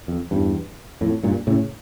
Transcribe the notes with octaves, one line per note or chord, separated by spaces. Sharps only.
F2
E2 G2
F2 A2
G2 A#2
A2 C#3